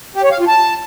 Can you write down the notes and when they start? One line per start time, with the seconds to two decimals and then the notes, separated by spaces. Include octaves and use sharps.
0.15 G4
0.23 C#5
0.31 F5
0.40 F4
0.48 A5